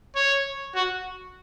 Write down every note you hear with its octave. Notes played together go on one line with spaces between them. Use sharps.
C#5
F#4